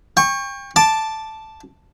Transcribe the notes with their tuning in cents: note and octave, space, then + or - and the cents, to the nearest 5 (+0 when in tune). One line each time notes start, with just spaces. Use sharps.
G5 +30 C#6 -10
A5 +0 D6 +5